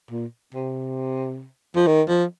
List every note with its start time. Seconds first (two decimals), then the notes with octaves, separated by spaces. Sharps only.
0.11 A#2
0.54 C3
1.76 F3
1.87 D#3
2.08 F3